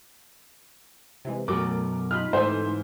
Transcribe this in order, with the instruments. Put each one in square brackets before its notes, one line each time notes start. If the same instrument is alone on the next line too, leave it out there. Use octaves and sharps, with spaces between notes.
[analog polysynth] C3 E3 G#3
[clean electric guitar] F#2 B2 [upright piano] F#3 D6 [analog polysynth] A3 A#4
[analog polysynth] D#4 F4 B5 [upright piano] F6
[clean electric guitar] G#2 E3 [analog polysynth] A3 D#4 [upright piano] C5